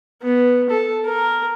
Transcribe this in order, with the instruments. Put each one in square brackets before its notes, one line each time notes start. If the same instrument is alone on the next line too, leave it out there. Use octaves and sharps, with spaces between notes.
[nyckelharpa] B3
A4
A#4